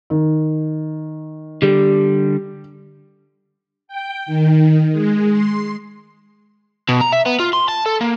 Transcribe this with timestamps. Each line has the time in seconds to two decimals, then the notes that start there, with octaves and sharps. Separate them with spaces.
0.10 D#3
1.62 D3 G3 G4
3.88 G5
4.26 D#3
4.92 G#3
5.31 C6
6.89 B2
7.01 A#5
7.12 E5
7.26 B3
7.39 F4
7.53 C6
7.69 A5
7.86 A4
8.01 A#3